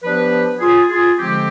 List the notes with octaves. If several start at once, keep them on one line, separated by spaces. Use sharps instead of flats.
F3 B3 D4 G4 B4
F4 G#4
F4 G#4
D3 F3 G#3 C4 G4